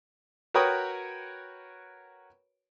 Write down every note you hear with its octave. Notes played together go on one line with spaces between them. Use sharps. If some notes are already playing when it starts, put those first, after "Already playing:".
F#4 A#4 B4 C#5 G5 D#6